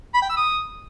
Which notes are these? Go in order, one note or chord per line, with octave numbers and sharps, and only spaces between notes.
B5
G5
E6
D#6